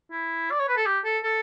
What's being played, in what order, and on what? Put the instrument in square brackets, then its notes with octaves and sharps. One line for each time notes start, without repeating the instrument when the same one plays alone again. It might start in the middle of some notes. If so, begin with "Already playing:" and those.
[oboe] E4
D5
C#5
B4
A4
G4
A4
A4